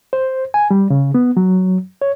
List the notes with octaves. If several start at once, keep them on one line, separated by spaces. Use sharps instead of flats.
C5
G#5
G3
C#3
B3
F#3
C#5